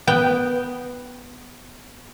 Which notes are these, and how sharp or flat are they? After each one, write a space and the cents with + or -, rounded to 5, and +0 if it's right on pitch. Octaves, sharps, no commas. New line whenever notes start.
B3 +0 G5 -5